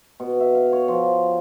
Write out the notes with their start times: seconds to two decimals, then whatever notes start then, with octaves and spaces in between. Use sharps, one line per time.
0.20 B2
0.40 E5
0.55 F5
0.73 C#5
0.88 F3